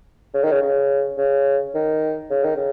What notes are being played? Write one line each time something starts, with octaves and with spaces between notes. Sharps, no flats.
C#3
D#3
C#3
C#3
C#3
D#3
C#3
D#3
C#3